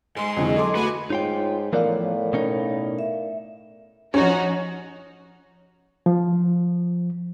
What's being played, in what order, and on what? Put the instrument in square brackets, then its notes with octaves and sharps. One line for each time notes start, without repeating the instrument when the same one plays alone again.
[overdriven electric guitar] G#2 G#3 [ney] G#5 [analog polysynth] C6
[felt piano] F2 D3 E3 [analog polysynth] F#3 G#4 [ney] D#5
[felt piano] A4 C6 D6
[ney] A3 [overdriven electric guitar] B3 B4 [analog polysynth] F#4 G#5
[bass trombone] G#2 [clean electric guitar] D#4 F4 G5 [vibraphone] C#5
[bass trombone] A2 [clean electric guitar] E3 F3 B3 [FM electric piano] A#4 D5 F5
[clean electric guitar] B2 C#4 D#4
[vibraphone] E5
[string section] F3 D#4 F#4 [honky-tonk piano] C#4 C#5
[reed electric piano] F3